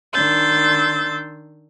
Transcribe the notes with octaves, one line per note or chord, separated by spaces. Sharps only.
D#3 D4 C6 E6 G6 A6